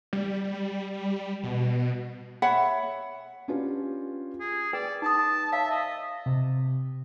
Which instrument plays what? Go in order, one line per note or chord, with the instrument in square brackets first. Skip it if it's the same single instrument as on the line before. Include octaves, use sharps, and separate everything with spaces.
[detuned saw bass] G3
B2
[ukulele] C#5 E5 F#5 B5
[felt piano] C#4 D4 F4 G4 B4
[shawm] G#4
[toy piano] G#4 B4 G5 [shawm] D5
[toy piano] D#4 D#6 [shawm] A5
[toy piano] C#5 F5 A5 [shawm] E5
[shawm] D#5
[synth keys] C3